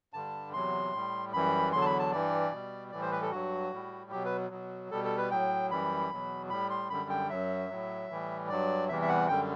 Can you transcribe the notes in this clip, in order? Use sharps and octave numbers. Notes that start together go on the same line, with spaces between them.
G2 D3 G3 A5
E2 C3 F#3 C6
A2 G3
F#2 E3 G3 B5
E2 D3 F#3 C6
A5
B5
A5
G2 E3 G3 D5
B2 G3
A2 E3 G3 D5
C5
B4
A4
G2 F#3 F#4
A2 G3
B2 F#3 G4
B4
B2 F#3
B2 G3 A4
A4
B4
A2 F#3 G5
F#2 E3 G3 B5
E2 B2 F#3
A2 G3 B5
C6
F#2 D3 G3 B5
G5
F#2 F#3 E5
A2 F#3
A2 E3 G3
G2 F#3 D5
E2 C3 E3 G3 E5
E5
F#5
F#2 D3 G3 G5